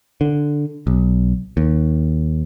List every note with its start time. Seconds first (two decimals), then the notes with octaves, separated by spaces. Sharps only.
0.21 D3
0.87 B1
1.57 D#2